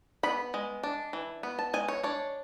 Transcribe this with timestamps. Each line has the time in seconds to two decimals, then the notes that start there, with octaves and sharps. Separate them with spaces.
0.23 B3 B5
0.54 G#3
0.83 D4
1.13 E3
1.43 B3
1.59 A5
1.74 G#3 G#5
1.88 C#5
2.03 D4 C#5